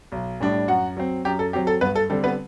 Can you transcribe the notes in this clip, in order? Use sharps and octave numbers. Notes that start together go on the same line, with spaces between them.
B1
A2 G3 D4
F#2 F#4 F#5
F#3 C4
F#2 G4
A4
F#3 C4 G4
A4
G2 B3 B4
A4
D3 G3 C4 A4
B3 B4